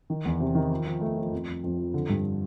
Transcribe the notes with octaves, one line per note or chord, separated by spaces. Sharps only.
D#3
E2
C3
D#3
F3
F3
A3
F3
F2
F2
F2
F3
D3
G2